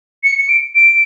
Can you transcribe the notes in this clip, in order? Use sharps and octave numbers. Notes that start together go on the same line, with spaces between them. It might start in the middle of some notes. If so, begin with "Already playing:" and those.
C#7
C#7
D7
D7